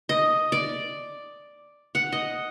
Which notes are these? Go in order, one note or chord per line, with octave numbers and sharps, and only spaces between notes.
D#5
D5
F#5
D#5